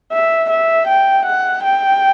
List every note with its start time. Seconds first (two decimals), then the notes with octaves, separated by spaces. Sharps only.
0.12 E5
0.50 E5
0.88 G5
1.26 F#5
1.63 G5